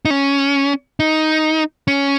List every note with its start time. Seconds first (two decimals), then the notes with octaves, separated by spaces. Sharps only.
0.05 D#4
0.10 C#4
1.00 D#4
1.88 C#4